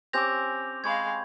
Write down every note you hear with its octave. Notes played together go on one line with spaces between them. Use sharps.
C4 C#4 G4 D6 E6 G6 A#6 F7
G#3 F5 B5 C#6 G#6